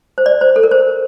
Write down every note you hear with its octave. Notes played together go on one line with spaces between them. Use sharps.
C5
D5
C5
A4
A#4
C5